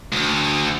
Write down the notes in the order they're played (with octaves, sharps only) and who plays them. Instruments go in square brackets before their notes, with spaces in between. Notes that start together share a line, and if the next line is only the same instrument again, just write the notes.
[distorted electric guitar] D2